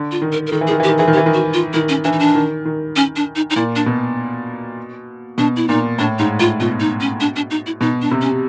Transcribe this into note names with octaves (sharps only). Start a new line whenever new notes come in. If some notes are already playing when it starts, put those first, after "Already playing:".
Already playing: D3
F4
D#3
A#4
A#4
D#3 A4
E3
G#4
D#3
E3 G4
D#3
E3 G#4
D#3
G4
E3
D#3
F#4
F4
D#3 E4
C#4
E3 D4
D#4
D4
D#3
D#3
C#4
D4
D#4
D#4
A#2 E4
D4
B2
B2 D4
E4
A#2 D#4
A2 D4
G#2 D#4
A2 F4
B2 F4
D#4
C#4
D4
D4
D#4
E4
B2 D#4
D4
C3
C#4